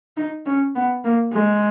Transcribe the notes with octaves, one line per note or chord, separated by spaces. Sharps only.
D#4
C#4
B3
A#3
G#3